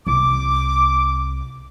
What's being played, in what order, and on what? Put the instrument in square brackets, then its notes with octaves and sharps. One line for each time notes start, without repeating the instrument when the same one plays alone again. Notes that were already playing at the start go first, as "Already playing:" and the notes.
[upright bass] C2 [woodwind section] D6